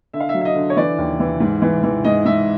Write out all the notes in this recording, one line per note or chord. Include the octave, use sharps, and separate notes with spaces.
D3 E5
F5
E5
F#3
E5
D#5
D3
C#5
E3 D5
D#2
E3
G#2
E3
E3
G#2 D#5
G#2 E5